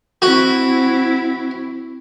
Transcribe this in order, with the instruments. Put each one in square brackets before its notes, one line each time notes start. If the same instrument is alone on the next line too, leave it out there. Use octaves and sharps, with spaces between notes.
[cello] C4 E4 [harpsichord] F#4